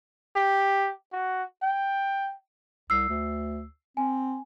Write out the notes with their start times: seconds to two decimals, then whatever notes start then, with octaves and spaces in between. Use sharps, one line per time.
0.36 G4
1.12 F#4
1.63 G5
2.90 C2 E6 C7
3.09 D2
3.97 C4 G#5